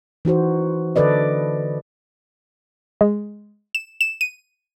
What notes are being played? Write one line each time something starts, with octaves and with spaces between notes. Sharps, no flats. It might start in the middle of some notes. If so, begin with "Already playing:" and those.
E3 D#4 F#4 C5
D3 A4 B4 D5 D#5
G#3
E7
E7
D#7